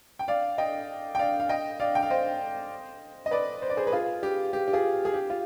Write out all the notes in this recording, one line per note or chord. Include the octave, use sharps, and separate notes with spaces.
G5
D5 F5
D#5 G5
G5
D5 F5
F5
D#5 G5
D5 F5
G5
F5
C5 D#5
D#5
B4 D5
C5
D5
G#4 C5
B4
F4 G#4
G4
G4
G4
F4 G#4
G#4
G4
F4